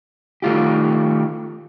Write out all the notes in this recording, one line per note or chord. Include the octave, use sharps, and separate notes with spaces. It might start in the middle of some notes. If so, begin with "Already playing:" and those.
D#3 A3 F4 G4